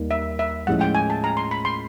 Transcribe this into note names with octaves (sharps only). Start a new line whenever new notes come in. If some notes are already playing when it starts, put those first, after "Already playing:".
Already playing: D#2 D#3 G3 A#3
E5
E5
A2 F3 G#3 C#4 E4 F#5
G5
G#5
A5
A#5
C6
B5
C6